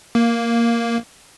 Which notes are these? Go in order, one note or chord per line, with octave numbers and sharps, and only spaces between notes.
A#3